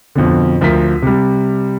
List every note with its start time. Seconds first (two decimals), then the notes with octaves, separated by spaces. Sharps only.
0.15 F2 B2 D3
0.61 D2 F3 A#4 B6
1.02 C3 G3